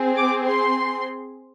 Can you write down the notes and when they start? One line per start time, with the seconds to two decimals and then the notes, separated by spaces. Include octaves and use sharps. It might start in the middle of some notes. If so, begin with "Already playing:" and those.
Already playing: C4 G#4
0.16 D6
0.46 C6